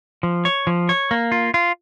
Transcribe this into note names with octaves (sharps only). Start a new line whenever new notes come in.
F3
C#5
F3
C#5
A#3
F4
F4